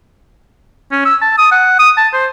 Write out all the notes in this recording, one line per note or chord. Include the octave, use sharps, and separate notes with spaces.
C#4
E6
A5
D#6
F#5
D#6
A5
C5